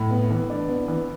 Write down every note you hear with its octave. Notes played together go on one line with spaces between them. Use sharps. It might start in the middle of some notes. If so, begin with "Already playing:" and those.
Already playing: A2
B3
E3
D4
B3
E3